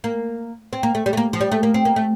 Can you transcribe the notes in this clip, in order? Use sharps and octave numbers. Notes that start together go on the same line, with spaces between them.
A#3
C4
A#3
A3
G3
A3
A#3
F3
G3
A3
A#3
C4
A#3
A3